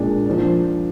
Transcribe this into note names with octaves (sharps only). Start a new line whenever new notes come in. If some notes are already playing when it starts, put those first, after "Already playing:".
Already playing: A#2 G#3 D4
F3 A#3 D4